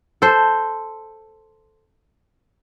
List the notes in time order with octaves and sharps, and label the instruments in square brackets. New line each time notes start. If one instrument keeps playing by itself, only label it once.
[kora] A4 C5